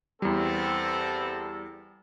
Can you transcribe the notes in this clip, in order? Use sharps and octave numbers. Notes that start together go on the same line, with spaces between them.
E2 G3 B3 C4 A4